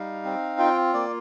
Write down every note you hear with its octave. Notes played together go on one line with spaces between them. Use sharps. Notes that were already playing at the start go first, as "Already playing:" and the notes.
Already playing: G3 D#4 F5
C4
F4 G5
A#3 D5